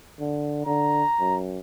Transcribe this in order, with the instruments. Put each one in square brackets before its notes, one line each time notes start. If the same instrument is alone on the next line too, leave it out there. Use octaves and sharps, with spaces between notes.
[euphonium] D3
[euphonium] D3 [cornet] A#5
[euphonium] F#2